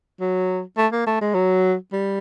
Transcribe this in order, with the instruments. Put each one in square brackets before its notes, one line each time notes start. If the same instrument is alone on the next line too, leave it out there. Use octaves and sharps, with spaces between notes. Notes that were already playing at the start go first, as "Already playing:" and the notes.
[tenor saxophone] F#3
A3
A#3
A3
G#3
F#3
G3